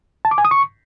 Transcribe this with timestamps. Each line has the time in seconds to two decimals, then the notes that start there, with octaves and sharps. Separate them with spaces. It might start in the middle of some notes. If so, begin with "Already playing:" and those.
0.25 A5
0.31 D6
0.38 G#5
0.45 D#6
0.51 C#6